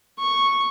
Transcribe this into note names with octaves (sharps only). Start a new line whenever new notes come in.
C#6